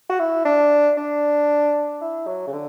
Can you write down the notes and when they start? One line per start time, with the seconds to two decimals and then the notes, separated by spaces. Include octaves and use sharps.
0.09 F#4
0.19 E4
0.45 D4
0.97 D4
2.01 E4
2.27 F#3
2.47 C#3
2.53 D3